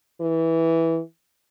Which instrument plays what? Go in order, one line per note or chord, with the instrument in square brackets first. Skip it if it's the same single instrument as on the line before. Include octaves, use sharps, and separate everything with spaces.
[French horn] E3